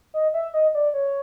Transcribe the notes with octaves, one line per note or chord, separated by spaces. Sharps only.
D#5
E5
D#5
D5
C#5